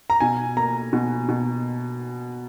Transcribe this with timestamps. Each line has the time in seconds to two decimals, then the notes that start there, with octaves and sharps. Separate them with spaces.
0.10 A#5
0.20 B2 G#5
0.57 A#3 A#5
0.93 B2
1.29 B2